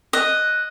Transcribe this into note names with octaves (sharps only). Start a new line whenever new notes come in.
D#5 F#6